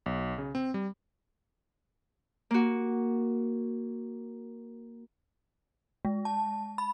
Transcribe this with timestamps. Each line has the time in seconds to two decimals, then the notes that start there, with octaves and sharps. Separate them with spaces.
0.06 B1
0.38 C#3
0.55 C4
0.74 G3
2.51 A#3 F#4
6.05 G#3
6.25 A5
6.78 B5